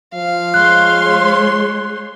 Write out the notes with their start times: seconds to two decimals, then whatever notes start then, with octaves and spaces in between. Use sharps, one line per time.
0.15 F3 F5
0.54 G#3 C#5 C6 F#6